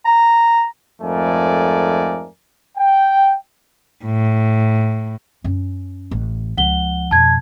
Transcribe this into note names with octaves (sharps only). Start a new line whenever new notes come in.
A#5
F2 G#2 A3 A#4 D5 G#5
G5
A2
F#2 C#4
A1
C#2 F3 F#5 G7
F2 B2 A5 G#6